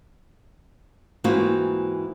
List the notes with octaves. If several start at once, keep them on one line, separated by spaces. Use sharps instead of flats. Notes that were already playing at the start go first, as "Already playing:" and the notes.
G#2 E3 A#3 C4 F4 F#4